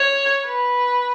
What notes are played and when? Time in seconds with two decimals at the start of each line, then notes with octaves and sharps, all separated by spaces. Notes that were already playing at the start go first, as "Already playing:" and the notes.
Already playing: C#5
0.45 B4